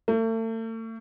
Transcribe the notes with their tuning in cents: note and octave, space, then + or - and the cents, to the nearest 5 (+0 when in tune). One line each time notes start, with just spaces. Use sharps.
A3 +40